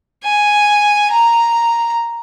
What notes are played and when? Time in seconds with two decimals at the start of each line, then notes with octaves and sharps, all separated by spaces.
0.24 G#5
1.11 A#5